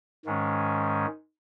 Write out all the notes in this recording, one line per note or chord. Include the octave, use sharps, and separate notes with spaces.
G#2 D#3 G#3 C#4